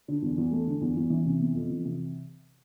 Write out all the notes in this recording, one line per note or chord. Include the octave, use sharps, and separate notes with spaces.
D3
E2
E2
A3
D3
E2
E2
E3
C3
B3
F2
E3
C3